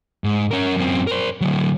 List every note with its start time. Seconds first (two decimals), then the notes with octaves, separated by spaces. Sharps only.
0.24 G#2
0.51 C#4 A#4
0.77 F#2 C4
1.07 A#4 C5
1.41 D3 F#3